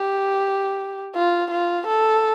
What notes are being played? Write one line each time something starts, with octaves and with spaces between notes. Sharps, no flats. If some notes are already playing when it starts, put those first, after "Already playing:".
Already playing: G4
F4
F4
A4